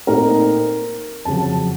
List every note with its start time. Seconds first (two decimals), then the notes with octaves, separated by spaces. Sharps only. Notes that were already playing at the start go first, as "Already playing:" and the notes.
0.07 A#2 A3 C4 D#4 A#4
1.25 F2 C#3 F#3 A5